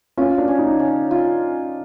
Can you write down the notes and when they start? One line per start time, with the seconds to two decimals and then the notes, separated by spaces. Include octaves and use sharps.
0.17 C#4 F4
0.38 D4
0.48 C#4
0.59 D#4
0.79 C#4
1.11 F4